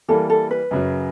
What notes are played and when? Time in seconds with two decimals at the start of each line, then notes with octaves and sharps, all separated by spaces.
0.08 E3 G3 A#3 A4
0.30 A4
0.51 B4
0.71 F#2 C#3 F#3